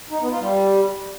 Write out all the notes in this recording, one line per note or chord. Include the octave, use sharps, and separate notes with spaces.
D#4
B3
F4
G3